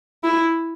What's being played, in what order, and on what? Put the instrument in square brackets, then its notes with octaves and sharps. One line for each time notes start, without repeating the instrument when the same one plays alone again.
[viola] E4